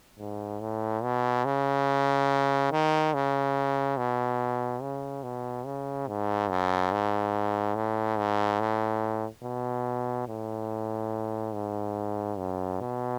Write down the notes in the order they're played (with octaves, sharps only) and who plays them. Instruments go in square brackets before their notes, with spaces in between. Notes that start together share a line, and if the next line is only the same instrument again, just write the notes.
[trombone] G#2
A2
B2
C#3
D#3
C#3
B2
C#3
B2
C#3
G#2
F#2
G#2
A2
G#2
A2
B2
A2
G#2
F#2
B2